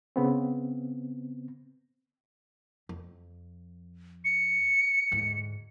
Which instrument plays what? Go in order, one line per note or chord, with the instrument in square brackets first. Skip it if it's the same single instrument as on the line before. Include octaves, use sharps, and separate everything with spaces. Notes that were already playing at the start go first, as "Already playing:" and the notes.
[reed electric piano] C#3 B3 C4
[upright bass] F2
[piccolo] C#7
[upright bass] D2 G#2